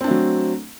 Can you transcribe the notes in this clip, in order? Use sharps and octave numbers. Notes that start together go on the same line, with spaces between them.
F#3 A3 C4 D4